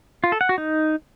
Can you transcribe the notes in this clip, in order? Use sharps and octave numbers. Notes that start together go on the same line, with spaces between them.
F4
A4
F#5
F#4
D#4